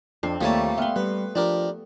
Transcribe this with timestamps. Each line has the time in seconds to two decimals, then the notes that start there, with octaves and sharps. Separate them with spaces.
0.23 F2 C4 D4 C7
0.41 D#2 F3 G3 A3 A#3 C#5 A5
0.78 B3 E5 F5 G5 C6
0.96 G3 B4
1.35 F3 D4 G4 A#4